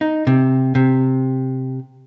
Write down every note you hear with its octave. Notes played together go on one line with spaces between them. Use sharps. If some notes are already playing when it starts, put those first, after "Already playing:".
D#4
C3
C3